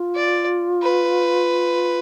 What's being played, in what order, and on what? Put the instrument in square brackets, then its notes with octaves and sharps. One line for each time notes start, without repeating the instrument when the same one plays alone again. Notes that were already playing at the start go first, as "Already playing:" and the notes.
Already playing: [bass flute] F4
[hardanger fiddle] D5
B4